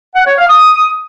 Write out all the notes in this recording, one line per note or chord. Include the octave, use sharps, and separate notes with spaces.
F#5
C#5
F5
D#6